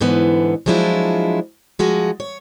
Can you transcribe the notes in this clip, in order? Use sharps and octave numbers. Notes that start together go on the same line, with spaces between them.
G#2 D3 E3 B3
F3 F#3 G#3 D4 E4 F4
F3 G#3 F#4
C#5